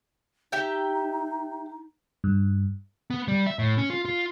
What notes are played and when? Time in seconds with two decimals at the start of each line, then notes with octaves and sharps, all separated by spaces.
0.52 D#4 G4 E5 G5
2.24 G2
3.10 B3
3.28 G3
3.47 E5
3.59 A2
3.78 C#4
3.90 F4
4.05 F4